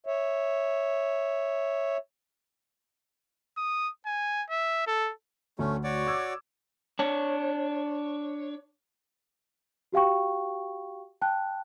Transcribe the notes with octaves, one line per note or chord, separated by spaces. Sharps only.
C#5 E5
D#6
G#5
E5
A4
D2 A3 C#4
F#4 C#5 D5
D6 E6 G#6
D4 C#5
F#4 G4 F5 G5 C#6
G5 A5 F#6